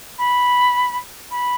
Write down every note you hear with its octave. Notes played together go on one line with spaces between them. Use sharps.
B5
B5